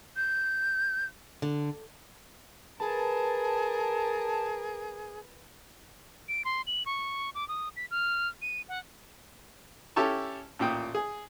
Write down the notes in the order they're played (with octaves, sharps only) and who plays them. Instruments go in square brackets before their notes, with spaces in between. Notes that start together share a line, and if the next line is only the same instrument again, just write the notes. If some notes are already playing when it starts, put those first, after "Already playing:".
[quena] G6
[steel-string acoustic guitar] D3
[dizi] G#4 [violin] A#4 [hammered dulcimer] B4 [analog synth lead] A5
[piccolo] D7
C6
F#7
C#6
D6
D#6
B6
F6
D#7
F#5
[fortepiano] C#4 E4 G4 A4 A5 C#6
A1 A#2 G5 D#6
G#4